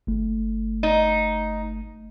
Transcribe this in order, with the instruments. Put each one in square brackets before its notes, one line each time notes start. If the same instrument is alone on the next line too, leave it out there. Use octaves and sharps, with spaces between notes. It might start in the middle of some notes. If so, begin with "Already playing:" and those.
[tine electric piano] G1 A3
[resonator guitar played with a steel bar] D#4